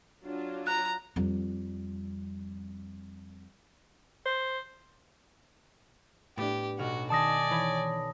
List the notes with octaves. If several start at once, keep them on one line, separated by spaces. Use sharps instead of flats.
F#3 D4 F4
A#5 F#6
F2 G3
C5
A2 B3 D4 G4
B1 F#4 F6
D#3 D5 F#5 G#5 A5 D#6 A#6 C#7
E3 C#5 B5 G#6